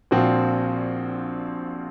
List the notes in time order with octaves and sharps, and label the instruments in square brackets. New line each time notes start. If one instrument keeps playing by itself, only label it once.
[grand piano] A#1 A#2 F3 C4 F#4